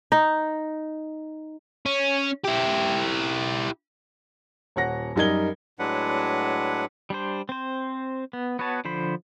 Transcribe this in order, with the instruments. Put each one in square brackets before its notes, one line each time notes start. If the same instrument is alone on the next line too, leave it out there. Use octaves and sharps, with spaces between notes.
[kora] D#4
[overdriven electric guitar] C#4
E4 G4
[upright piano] D#1 C#5 F#5 A#6
F#2 G3 D#4 A#4 G#6 G7
[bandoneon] A2 F#3 G#3 D4 B4 F#5
[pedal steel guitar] G3 D4 C5
C4 C5
B3
B3 F#4 B4 C#5 A5
D3 F3 C5 B5